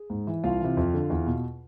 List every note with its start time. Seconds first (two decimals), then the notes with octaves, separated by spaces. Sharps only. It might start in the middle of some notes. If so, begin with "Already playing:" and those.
Already playing: G#4
0.10 G#2
0.27 E3
0.44 C2 F4 F5
0.61 C3 E3
0.77 F2
0.94 D3
1.10 E2
1.27 B2